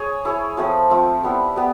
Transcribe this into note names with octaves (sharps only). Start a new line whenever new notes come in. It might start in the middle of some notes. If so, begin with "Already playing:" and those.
Already playing: G#4 C#5
E4 G#4 C#5
F3 A3 C4 F4
F3 A3 C4 F4
G3 B3 E4
G3 B3